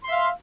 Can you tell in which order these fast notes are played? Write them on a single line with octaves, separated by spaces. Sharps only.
C6 E5 F5